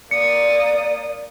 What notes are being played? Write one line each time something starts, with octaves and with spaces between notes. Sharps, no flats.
A#3 D5 D#6 C#7